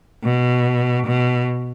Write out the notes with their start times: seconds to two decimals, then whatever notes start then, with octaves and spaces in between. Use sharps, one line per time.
0.24 B2
1.06 B2